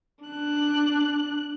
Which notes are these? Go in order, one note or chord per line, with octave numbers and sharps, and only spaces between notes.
D4 F#6